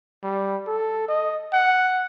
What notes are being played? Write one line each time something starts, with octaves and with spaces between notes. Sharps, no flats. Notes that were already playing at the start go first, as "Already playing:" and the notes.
G3
A4
D#5
F#5